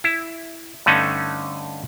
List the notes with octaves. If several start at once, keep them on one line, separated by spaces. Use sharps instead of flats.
E4
G2 D3 A3 C#4 D#4